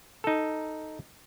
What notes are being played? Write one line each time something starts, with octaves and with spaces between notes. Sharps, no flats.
D#4 A4